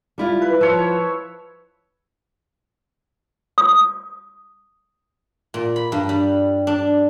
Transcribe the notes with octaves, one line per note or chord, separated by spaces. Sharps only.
G3 E4 F4
B4
F3 C#5 E5
D#6
A#2
B5
G2
G3
D4